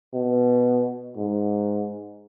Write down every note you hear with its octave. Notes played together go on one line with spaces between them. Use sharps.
B2
G#2